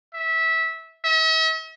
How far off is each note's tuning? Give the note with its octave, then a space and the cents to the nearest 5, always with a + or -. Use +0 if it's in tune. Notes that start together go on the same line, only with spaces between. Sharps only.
E5 -20
E5 -45